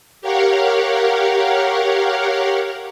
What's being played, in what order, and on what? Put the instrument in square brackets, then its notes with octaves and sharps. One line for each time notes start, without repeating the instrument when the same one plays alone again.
[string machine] G4 A#4 C#5 F5 F#5